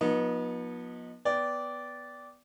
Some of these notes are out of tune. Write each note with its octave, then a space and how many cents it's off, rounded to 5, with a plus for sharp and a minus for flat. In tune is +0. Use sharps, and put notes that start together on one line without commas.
F3 +35 B3 -30 D#4 +0
B3 +0 D5 -15 G5 +0